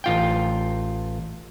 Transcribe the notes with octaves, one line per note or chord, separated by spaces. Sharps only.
A1 F4 G5